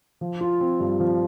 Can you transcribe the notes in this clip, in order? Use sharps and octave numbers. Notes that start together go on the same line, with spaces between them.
F3
F4
C4
G2
F3